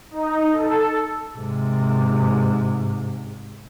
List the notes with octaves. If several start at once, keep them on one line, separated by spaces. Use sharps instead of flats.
D#4
A4
G#2 C3